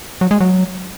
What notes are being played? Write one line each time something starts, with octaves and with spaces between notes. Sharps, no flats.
F#3
G#3
F#3